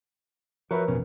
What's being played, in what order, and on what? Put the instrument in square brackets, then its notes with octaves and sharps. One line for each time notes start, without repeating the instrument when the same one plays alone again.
[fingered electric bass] F3 [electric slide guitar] F#4 C#5 E5 [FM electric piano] A#4 B4
[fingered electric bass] A1 F2 [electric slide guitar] B2 C#4